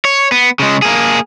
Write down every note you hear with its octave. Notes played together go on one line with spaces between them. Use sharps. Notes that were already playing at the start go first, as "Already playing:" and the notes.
C#5
B3
C#3 G#3
A#3 G#4